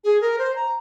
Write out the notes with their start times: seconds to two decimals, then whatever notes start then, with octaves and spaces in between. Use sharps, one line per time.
0.04 G#4
0.21 A#4
0.38 C5
0.56 A#5